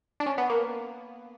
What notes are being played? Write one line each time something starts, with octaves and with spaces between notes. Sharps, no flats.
D4
C#4
B3
A#3